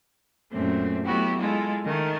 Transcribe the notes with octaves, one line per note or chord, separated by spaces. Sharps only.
F#2 A#2 A3 C4
F#3 A3 B3 E4 F#4 G4
G#3 E4 F4 A4
D#3 A3